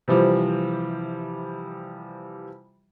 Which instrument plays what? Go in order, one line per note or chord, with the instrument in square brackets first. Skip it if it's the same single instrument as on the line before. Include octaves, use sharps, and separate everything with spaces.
[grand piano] C3 E3 F3 G3